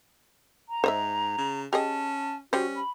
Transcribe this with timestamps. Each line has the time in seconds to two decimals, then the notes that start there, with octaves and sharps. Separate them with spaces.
0.69 A#5
0.84 G#2 C5 D#5 E5
1.38 C#3
1.73 C#4 G4 G#4 D#5 A5
2.53 G3 C#4 F#4 C5
2.76 B5